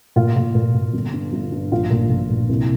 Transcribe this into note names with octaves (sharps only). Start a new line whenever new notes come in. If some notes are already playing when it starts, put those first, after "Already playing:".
A#2 F4
A#2
A#2
A#2
G1
G2
G1
G2
A#1 F4
A#2
A#2
A#2
C2